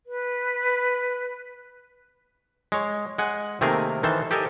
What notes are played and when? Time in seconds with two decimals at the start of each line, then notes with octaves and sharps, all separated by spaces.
0.06 B4
2.72 G#3 C#5
3.18 G#3 F#5 G#5
3.61 C3 D#3 A3 A#3 G#4 A#4
4.03 D#3 E3 A4 C5
4.31 G4 A4 A#4 D#5 G#5